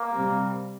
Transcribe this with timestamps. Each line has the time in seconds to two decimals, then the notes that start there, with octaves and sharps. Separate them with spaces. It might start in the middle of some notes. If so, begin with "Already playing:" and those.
Already playing: A#3
0.11 C3 G3 C4